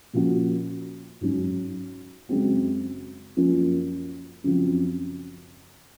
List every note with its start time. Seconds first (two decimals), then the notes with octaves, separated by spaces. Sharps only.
0.13 A#2 F3 A#3 C#4 F#4
1.21 G#2 F#3 C#4
2.29 F#2 C#3 G#3 C4 F#4
3.36 F#2 F3 A#3 C#4 F4
4.44 F#2 C#3 F3 C4